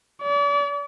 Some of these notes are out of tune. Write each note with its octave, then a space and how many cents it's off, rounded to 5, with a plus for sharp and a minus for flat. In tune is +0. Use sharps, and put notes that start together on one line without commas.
D5 -40